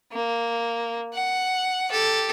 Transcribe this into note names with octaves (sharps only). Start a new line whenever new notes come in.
A#3
F#5
G4 A4